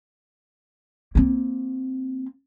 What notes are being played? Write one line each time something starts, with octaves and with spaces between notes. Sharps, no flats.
A#3 C4